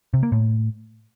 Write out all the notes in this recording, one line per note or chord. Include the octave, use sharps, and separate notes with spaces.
C3
A#3
A2